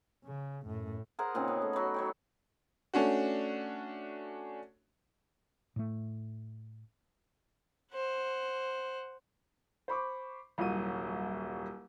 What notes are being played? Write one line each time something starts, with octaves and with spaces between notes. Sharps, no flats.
C#3
F#2 A2
G#4 A#4 C5 F#5
A#2 C#3 C4 D#4
B3
A3
F#3 B5
F#3 C#5 G5
A3 C#4 D4 F#4
A2 A3
C5 F#5
C5 B5 C#6 D6
D#1 C2 F#3 D#7